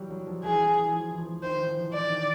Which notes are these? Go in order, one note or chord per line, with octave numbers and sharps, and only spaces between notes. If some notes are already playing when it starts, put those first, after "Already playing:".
Already playing: E3 F#3 G3
F#3
F3
E3 G#4
E3
E3
F3
E3
F3
D#3 C5
E3
F3
E3
E3 D5
D#3